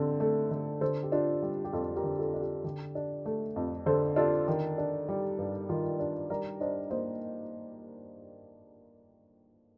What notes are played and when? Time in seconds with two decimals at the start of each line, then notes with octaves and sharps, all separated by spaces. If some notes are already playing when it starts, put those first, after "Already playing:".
Already playing: D3 C4
0.20 A3
0.51 D3
0.81 D3 A4 C5
1.03 G4
1.12 D4 F4
1.42 G3 G4
1.65 G4
1.73 F2 F4 A4
1.96 G4 A#4
2.04 D3
2.19 F4 A4
2.34 D4
2.41 G4
2.64 D3 G4
2.95 D4
3.26 A3
3.56 F2
3.86 D3 A4 C5
4.16 D4 F4 A4
4.48 D#3
4.78 D4
5.08 G3
5.38 G2
5.69 D#3 F4
6.00 D4
6.30 G3 A#4 D5
6.60 D4 C5 D#5
6.90 A#3 C5 D#5